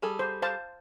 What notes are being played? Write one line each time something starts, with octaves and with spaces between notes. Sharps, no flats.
G3 G#4 A4
C5
C5 F5 A5